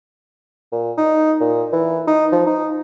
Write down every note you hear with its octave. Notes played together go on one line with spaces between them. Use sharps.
A#2
D#4
A#2
E3
D#4
F3
D#4